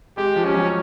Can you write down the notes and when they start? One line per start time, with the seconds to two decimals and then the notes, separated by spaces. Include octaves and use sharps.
0.17 G#3 G4
0.36 F3
0.45 C#4
0.54 F#3